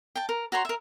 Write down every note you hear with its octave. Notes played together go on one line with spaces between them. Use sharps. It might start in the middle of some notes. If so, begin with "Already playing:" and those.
G5 A5
A#4
F#4 C#5 A#5 C6
A#4 E5